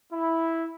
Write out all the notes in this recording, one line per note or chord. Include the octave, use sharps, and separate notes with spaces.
E4